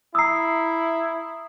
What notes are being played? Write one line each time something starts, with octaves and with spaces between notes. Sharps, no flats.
E4 A#5 D#6 E6 C7